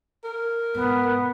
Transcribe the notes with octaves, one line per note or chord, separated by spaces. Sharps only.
A#4
G#2 B2 B3